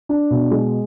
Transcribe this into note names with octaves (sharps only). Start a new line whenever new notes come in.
D4
B2
G#3